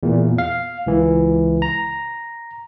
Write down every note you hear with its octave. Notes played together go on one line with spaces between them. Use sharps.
E2 A#2
F5
C#2 E3
A#5